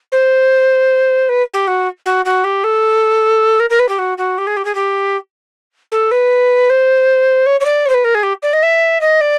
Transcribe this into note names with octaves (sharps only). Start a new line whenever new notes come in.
C5
B4
G4
F#4
F#4
F#4
G4
A4
A#4
A#4
B4
G4
F#4
F#4
G4
G#4
G4
G#4
G4
A4
B4
C5
C#5
C#5
D5
C#5
C5
B4
A#4
G#4
G4
D5
D#5
E5
D#5
D5